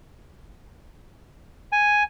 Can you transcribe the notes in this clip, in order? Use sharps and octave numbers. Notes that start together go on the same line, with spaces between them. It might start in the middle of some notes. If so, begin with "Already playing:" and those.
G#5